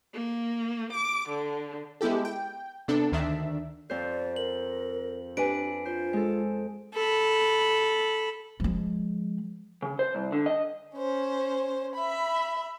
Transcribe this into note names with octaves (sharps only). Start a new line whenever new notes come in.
A#3
D6
D3
G#3 B3 E4 G4 A4
G5
C3 B3 D4 A4
D2 D#3 D4 E5
F2 C5 D5
A#4 F#7
D4 G4 B4 G#5 D7
F4 C5
G#3 A4
A4 B5
F3 G#3
C#3
C5
C2
D3
D#5
C#4 C5
E5 B5